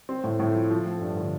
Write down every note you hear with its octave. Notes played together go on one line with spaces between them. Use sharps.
C4
A2
A2
F3
F3
A3
G2
D3